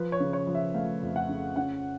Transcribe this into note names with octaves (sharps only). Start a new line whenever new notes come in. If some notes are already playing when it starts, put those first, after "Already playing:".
Already playing: F3 B4
C#5
C#3
C#5
F3
E5
A3 F5
F2
F#5
C#3
C#4 F#5